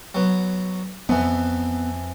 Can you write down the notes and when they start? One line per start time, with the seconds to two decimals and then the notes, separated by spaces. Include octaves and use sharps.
0.15 F#3 B3
1.09 F2 E3 B3